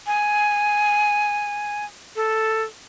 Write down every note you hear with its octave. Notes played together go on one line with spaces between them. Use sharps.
G#5
A4